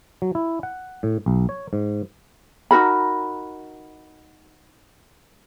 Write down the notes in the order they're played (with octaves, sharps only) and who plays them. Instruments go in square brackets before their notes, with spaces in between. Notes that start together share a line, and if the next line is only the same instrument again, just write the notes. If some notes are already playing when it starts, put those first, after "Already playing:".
[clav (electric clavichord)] F#3
E4
F#5
A2
B1
C#5
G#2
[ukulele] D#4 F#4 A#4 B5